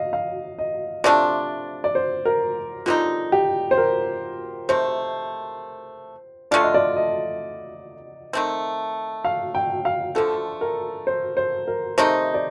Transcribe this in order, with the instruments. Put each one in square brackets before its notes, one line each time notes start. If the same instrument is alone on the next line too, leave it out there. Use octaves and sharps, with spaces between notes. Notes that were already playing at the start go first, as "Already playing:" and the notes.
Already playing: [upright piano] D#5 F5
F5
D#5
[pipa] C3 F3 A3 D4 [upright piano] D5
[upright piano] D5
C5
A#4
[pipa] D3 G3 C4 D#4 [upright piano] F4
[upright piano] G4
C5
A#4
[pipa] C3 D#3 A3 [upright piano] C5
[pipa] D3 A3 D4 F4 [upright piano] D5
[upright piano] D#5
D5
D#5
[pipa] D#3 A3 C4
[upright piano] F5
G5
F5
[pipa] D3 F3 A3 [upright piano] A4
[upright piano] A#4
C5
C5
A#4
[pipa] C3 D#3 A3 D#4 [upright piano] C5
[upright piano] D5